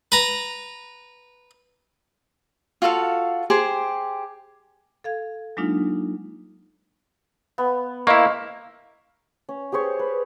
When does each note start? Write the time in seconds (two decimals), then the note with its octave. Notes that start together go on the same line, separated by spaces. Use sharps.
0.12 B4 A#5
2.82 F4 F#4 A4 F5
3.50 G4 G#4 C5 C6
5.04 A4 F5 G#6
5.57 F#3 G#3 A#3 D4 D#4 F4
7.58 B3
8.07 A#3 E4 C5 D#5 F5 C#6
9.49 C#4
9.72 G4 G#4 C5 C#5
9.99 B4